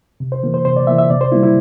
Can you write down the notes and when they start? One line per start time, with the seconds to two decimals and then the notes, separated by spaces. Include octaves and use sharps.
0.20 C3
0.32 C5
0.43 E3 A#3
0.54 C5
0.65 C3 C5
0.76 D5
0.87 E3 A#3 E5
0.98 E5
1.10 C3 D5
1.21 C5
1.32 G3 A#3 E4
1.43 E4